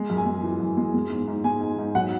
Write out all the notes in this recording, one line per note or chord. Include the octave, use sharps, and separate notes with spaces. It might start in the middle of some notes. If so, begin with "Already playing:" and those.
Already playing: G#3
F#2
G#5
G#3
E3
F#2
G#3
G#3
G#2
G#2
G#3 G#5
G#2
G#2
F#3 F#5